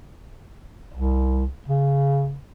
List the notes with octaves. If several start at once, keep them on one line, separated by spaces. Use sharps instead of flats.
C2
C#3